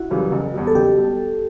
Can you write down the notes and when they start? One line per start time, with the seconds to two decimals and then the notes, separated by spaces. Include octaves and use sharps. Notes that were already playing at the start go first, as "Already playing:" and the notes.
Already playing: E4 F#4
0.10 F#2 C#3 E3 G3
0.32 F#1
0.54 E2 B2 G3
0.67 A4
0.75 F#1 G4
0.97 B2 G3